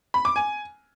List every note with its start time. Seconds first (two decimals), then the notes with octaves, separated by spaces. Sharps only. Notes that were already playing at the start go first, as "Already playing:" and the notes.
0.14 B5
0.25 D6
0.36 G#5